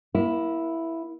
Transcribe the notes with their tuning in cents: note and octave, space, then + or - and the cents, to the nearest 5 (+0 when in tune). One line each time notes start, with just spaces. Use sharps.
A#3 +30 E4 +0